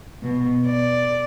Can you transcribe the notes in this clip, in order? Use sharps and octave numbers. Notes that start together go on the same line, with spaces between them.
B2
D5